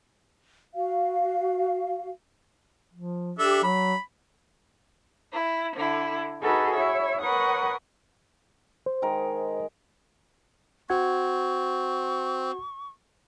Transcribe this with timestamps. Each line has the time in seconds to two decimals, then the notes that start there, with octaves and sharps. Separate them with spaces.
0.75 F#4 F5
2.94 F3
3.39 D4 G4 A4 E5
3.63 F#3 B5
5.33 E4
5.76 D3 E4
6.41 D#4 F#4 G#4 A4 B4
6.75 E4 C#5 E5
7.20 A#4 B4 C#5 F#5 C#6 D#6
8.86 C5
9.02 D#3 G#3 A#4
10.90 C4 F#4 F#5 C#6 G#6